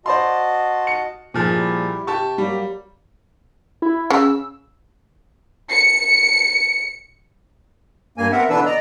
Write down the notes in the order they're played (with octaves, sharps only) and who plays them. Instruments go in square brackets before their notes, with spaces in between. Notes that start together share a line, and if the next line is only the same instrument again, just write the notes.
[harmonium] F#4 D#5 A5 [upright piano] C5 D5 C6
[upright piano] C#7
[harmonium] D2 G2 D#3 [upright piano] A#2 F3 G#4
[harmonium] G3 E4 G4
[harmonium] C3 [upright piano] G4 A5 C#6
[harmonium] F#3 A#3 G4 [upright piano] G3
[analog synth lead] E4
[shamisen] C#3 [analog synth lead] E6
[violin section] C#7
[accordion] G2 A#3 G#5
B3 C4 A#4 E5 F#5
B2 D3 E3 D4 B4 E6
D5 D#5 A#5